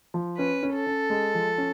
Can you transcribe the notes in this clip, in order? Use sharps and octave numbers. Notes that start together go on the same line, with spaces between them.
F3
C#4 B4
C#4
A4
C#4
G#3
F3
C#4